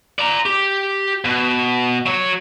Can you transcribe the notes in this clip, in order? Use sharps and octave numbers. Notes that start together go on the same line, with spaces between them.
D5 A#5
G4
B2
F#3 C#5